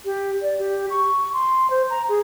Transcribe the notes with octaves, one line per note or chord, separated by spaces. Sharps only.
G4
D5
G4
C#6
C6
C5
A#5
G#4